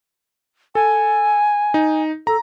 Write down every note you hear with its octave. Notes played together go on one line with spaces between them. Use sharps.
A4 G#5
D#4
A4 A#5